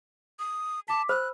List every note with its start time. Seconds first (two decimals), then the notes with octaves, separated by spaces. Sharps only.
0.39 D#6
0.88 A5 D6 B6
1.09 C5 B5 E6 F#6